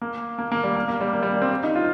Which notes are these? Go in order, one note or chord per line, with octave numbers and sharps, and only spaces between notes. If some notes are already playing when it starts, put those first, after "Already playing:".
A#3
A#3
A#3
G3
A#3
A#3
G3
A#3
G3
A#3
C4
D#4
F4